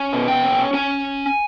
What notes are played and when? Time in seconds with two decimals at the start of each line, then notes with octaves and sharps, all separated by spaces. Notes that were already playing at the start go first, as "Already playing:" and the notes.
Already playing: C#4
0.12 B2
0.28 G5
0.44 C#4
0.73 C#4 G#5